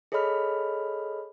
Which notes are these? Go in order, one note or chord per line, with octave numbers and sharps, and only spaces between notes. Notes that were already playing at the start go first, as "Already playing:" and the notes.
G#4 A4 C#5 D#5 B5 F6